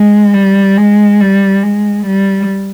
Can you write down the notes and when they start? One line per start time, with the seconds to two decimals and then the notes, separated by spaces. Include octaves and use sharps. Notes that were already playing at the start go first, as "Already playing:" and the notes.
Already playing: G#3
0.34 G3
0.77 G#3
1.20 G3
1.63 G#3
2.06 G3